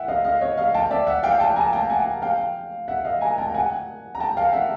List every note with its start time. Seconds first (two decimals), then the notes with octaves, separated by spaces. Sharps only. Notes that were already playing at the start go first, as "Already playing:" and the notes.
Already playing: E5 F#5 G5
0.08 D#5 F5
0.24 D#5 F5
0.41 C#5 D#5
0.57 D#5 F5
0.74 G5 A5
0.91 D5 E5
1.07 E5 F#5
1.23 F5 G5
1.40 G5 A5
1.56 G#5 A#5
1.73 G5 A5
1.90 F#5 G#5
2.22 F5 G5
2.88 E5 F#5
3.04 D#5 F5
3.21 G#5 A#5
3.38 G5 A5
3.50 G5
3.54 F#5 G#5
4.15 A#5
4.20 G5 A5
4.37 F5 G5
4.53 E5 F#5